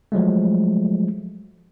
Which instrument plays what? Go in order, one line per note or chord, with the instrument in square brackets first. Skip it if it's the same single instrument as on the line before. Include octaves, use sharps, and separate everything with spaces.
[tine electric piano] F3 F#3 G#3 A3